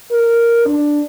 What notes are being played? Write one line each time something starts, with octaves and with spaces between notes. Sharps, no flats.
A#4
D4